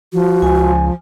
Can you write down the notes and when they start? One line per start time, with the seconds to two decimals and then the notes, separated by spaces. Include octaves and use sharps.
0.13 F3 F#4
0.42 C#2 G#5